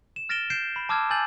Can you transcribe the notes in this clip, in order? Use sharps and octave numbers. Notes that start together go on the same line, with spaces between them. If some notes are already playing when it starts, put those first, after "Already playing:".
E7
F6 A6 A#6 D7 E7 G7
G6 C7 D7 E7
B5
A5 D6 E6 F6 G#6
G#5 E6 G6 A6 F#7